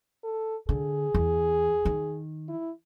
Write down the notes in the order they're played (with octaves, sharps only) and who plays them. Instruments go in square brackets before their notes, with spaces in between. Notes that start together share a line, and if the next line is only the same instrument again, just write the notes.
[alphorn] A4
[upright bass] D3 [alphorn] G#4
[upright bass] E2
D#3
[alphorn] E4